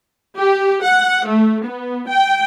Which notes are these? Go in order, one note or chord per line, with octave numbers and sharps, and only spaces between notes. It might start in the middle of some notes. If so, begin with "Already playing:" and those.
G4
F#5
A3
B3
G5